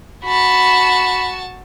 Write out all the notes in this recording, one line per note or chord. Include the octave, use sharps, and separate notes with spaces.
F#4 A5 B5